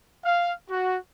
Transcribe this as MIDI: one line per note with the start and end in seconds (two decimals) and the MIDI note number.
0.24 0.52 77
0.68 0.97 66